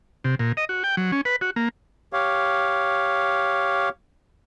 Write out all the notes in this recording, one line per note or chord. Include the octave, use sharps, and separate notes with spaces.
C3
A#2
D#5
F#4
G5
F#3
C#4
B4
F#4
A#3
G4 C#5 F5